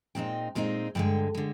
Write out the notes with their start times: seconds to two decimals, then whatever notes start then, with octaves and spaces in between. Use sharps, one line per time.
0.15 A#2 G#3 C4 D#4 G5
0.55 A#2 G#3 C4 D#4
0.95 G2 D3 G#3 G5
1.35 D3 G#3